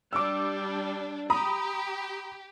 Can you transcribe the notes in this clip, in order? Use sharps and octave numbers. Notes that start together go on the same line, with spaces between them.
G3 D4 D6 E6
G4 A#5 B5 D#6